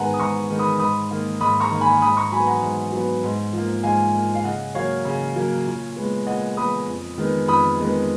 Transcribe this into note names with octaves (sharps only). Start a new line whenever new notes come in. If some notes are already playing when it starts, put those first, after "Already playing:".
Already playing: G#2 D#3 G#3 B3 F#5 G#5 A#5
D#6
G#2 A#5 C#6
D#3 G#3 B3
B5 D#6
G#2 B5 D#6
D#3 A#3
G#2 B5 D#6
A#5 C#6
D#3 A#3
G#5 B5
G#2 B5 D#6
A#5 C#6
F#3 B3 G#5 B5
F#5 A#5
G#2
F#3 B3
G#2
F3 A#3
G#2 F5 G#5
F3 A#3
F5
C#3 D#5 F#5
F#3 A#3 C#5 F5
C#3
F#3 A#3
A#2
G#3 B3
A#2 D#5 F#5
G#3 B3 B5 D#6
F2
D#3 G#3 B3
F2 B5 D#6
D#3 G#3 B3